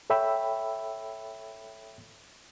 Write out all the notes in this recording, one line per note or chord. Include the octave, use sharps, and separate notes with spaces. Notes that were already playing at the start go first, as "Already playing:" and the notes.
A4 C#5 E5 G5 B5 E6